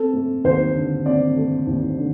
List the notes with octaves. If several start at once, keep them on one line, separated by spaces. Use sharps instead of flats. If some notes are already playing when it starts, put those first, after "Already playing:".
Already playing: C4 A4
A3
D#2 C5
D3
C4 D5
A3
D#2
D3